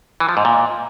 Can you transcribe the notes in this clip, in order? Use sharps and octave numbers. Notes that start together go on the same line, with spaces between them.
E3
F3
G#2
A#2